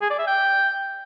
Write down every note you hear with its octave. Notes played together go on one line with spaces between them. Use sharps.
G#4
D5
E5
G5